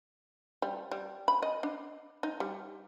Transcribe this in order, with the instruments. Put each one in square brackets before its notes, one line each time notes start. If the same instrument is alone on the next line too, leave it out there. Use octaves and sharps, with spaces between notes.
[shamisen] G3
G3
B5
D#5
D4
D#4
G3